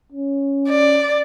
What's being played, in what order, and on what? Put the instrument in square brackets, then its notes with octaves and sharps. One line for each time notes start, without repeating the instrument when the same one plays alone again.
[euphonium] C#4
[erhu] D5